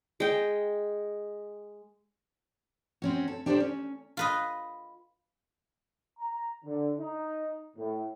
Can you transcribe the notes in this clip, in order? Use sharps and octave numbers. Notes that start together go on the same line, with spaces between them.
G#3 G5
C4 C#4 F#4
A4
D4 G4 A4 A#4 C5 D5
C#4
F4 B4 D#5
A#5
D3
D#4
A2